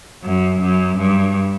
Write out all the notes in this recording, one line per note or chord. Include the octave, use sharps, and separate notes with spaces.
F#2
F#2
G2